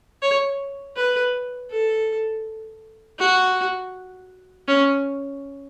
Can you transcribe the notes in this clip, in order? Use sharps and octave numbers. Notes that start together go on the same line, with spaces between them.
C#5
B4
A4
F#4
C#4